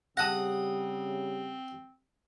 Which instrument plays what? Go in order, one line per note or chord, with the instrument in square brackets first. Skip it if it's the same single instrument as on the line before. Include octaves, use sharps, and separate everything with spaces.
[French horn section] C#3 G3 [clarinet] C4 [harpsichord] F#5 D#6 [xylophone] A5 F#6 A#6